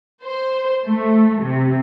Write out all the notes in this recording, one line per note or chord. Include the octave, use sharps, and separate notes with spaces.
C5
A3
C3